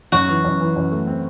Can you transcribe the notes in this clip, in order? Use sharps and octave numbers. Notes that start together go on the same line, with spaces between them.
F#2 F#4
E3
F#2
E3
F#2
A3
C4